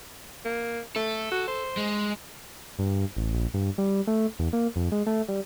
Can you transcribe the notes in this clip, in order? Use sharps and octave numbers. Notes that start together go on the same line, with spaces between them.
A#3
A3 A4
F#4
C5
G#3
G2
A1
A#1
G2
G3
A3
E2
A#3
F2
G#3
A3
G3